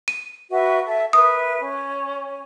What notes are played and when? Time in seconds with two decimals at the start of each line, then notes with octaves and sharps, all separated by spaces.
0.08 D#7
0.50 F#4 B4 E5
0.85 A4 E5
1.13 A#4 B4 E5 D#6
1.60 C#4